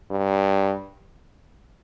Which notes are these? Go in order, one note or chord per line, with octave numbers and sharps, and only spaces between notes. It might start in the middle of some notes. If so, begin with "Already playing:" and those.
G2